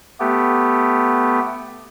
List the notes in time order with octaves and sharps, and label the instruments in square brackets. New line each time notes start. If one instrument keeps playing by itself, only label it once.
[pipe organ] A3 B3 G4